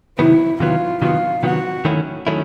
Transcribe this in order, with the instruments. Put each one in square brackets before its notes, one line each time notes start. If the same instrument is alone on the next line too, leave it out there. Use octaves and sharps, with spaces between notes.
[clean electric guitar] C3 D#3 F#3 B3 [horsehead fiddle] E4
[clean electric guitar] C3 D#3 F#3 B3 [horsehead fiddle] F4
[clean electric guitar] C3 D#3 F#3 B3 [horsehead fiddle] F4
[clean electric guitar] C3 D#3 F#3 B3 [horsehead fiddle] F#4
[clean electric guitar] D#3 F#3 A3 C#4 E4
D#3 F#3 A3 C#4 E4